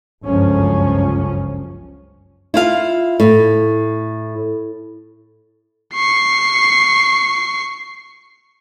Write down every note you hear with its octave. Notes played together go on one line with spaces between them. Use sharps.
G1 C#2 F#2 C#3 F3 C#4
E4 F4 F5
A2
C#6 C7